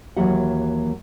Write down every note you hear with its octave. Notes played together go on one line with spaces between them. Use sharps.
D#2 E3 F#3 A#3 G4 F#5